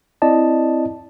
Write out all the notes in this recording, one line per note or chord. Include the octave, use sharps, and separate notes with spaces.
C4 E4 D5 D#5 A5